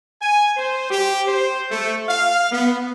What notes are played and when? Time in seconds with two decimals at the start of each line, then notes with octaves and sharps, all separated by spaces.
0.22 G#5
0.57 C5
0.91 G4
1.27 C5
1.71 A3
2.08 F5
2.51 B3